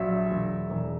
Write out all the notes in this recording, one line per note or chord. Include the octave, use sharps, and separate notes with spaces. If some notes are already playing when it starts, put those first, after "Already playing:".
Already playing: A#1 F#3 E5
E1
E1